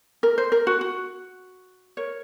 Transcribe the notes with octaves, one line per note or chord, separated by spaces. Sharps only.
A#4
C5
A#4
F#4
F#4
A#4 C#5